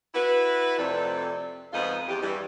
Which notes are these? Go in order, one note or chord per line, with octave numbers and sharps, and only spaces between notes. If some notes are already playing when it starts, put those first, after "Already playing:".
E4 F#4 B4
F2 C3 A3 A4 D5
F2 G#2 B3 F4 D#5 F5
E2 G4
G2 E3 G3